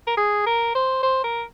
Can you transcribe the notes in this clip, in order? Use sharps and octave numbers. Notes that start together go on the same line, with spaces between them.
A#4
G#4
A#4
C5
C5
A#4